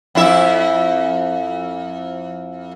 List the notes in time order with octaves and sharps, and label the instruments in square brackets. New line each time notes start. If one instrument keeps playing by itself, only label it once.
[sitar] F2 E4 E5